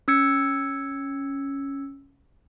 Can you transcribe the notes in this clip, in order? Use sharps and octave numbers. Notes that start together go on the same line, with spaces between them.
C#4 E6 G#6 C#7